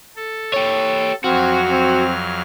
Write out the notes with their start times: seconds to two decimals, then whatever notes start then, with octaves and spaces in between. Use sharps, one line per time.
0.16 A4
0.54 G4 C#5
1.24 F2 F#3 C4 F#4 F6
1.70 C4